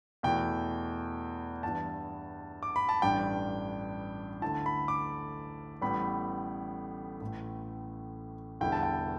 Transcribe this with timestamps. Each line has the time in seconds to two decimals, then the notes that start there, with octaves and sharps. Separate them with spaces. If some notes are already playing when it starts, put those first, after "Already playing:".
0.23 E2 B2 A3 E4 G5
1.63 G2 E3 G3 B3 E4 A5
2.63 D6
2.76 B5
2.89 A5
3.02 A1 G2 G3 D4 G5
4.42 D2 D3 A3 E4 A5
4.66 B5
4.88 D6
5.81 A1 A2 G3 B3 B5
7.21 A1 A2 A3
8.61 E1 E2 D3 G3 E4 G5
8.72 A5
8.83 G5